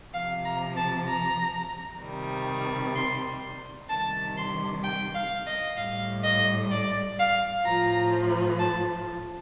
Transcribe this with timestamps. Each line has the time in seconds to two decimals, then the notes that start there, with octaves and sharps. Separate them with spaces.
0.13 C3 F3 F5
0.44 A#5
0.76 A5
1.07 A#5
2.01 C3 D#3 G3
2.94 C6
3.88 C3 D#3 G3 A5
4.36 C6
4.83 G5
5.14 F5
5.45 D#5
5.77 A2 G3 F5
6.23 D#5
6.71 D5
7.18 F5
7.65 A2 F3 A#5
8.59 A5